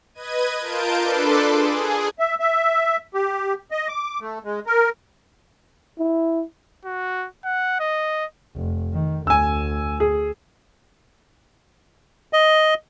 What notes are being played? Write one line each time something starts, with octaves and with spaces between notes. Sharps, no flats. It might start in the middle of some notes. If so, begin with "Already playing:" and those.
B4 D#5 G#6 D#7
F4 A#4 A5 G6 D7
D4 A4 B4 C6 D6
G#4
E5
E5
G4
D#5
D6
A3
G#3
A#4
E4
F#4
F#5
D#5
F1
D#3
D2 G#5 E6
G#4
D#5